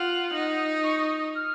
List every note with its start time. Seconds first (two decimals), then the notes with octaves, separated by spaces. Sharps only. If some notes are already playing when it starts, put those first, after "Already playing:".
Already playing: F4 F#5
0.34 D#4
0.84 C#6
1.00 D#6
1.18 D#6
1.35 F6